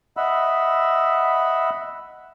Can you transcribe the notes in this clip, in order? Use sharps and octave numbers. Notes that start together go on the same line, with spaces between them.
D#5 E5 F#5 B5 E6